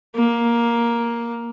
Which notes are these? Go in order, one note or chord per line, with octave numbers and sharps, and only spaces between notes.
A#3